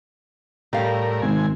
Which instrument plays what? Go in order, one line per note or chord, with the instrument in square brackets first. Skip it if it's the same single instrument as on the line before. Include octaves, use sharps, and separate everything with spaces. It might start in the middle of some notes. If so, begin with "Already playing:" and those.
[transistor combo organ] A2 A#4 [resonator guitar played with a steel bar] G3 F5
[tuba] G#1 [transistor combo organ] C3 G#5